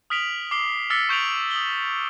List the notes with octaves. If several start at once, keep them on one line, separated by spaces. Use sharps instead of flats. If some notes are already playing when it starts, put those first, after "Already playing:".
D#6 F6 B6 D7 F7 F#7
D6 C7 G7
D6 E6 F6 A6 B6 C#7
C#6 G6 D7 F7 F#7
D#6 F#7 G7